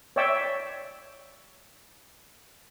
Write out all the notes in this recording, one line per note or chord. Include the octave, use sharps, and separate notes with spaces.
C#5 D5 E5 G5 E6